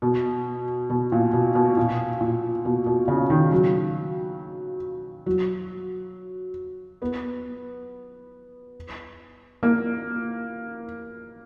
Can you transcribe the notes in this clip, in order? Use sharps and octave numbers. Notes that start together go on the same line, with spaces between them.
B2
B2
A#2
B2
B2
A#2
A#2
B2
B2
C#3
D#3
F#3
F#3
B3
A#3